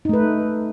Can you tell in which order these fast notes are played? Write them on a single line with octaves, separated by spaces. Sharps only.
D#4 A3 B4